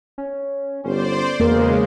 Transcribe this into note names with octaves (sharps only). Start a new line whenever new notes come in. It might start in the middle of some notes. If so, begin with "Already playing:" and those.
C#4
G1 C#4 C5 D5
E1 E2 C#3 G#3 A#3 A#4